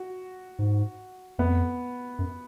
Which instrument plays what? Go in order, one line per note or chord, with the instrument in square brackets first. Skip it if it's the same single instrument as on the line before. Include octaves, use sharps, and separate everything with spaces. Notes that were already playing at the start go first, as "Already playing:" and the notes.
Already playing: [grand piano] F#4
[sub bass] G#2
[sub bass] F2 [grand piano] B3
[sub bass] F#2